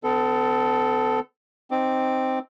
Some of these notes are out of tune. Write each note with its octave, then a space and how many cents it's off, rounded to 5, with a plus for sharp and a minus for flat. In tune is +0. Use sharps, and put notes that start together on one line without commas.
D3 +0 B3 +45 A4 +0
C4 +0 D#4 +0 D6 +0